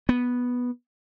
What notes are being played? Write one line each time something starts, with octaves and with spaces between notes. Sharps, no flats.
B3